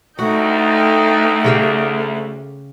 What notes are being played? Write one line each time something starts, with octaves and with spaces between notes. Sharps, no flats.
D2 A3 D#4 F#4 G5
C#3 G4 F5